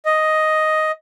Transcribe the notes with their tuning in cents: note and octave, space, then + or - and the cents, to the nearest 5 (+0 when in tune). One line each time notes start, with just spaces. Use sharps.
D#5 +5